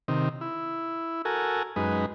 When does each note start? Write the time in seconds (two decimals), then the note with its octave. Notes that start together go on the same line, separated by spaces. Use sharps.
0.08 C3 D#3
0.41 E4
1.25 F#4 A4 A#4 G#5
1.76 F#2 G#3 D#4 B4